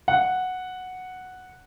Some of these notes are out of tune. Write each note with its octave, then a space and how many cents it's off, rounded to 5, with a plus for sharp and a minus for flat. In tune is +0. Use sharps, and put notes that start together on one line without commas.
F#5 -5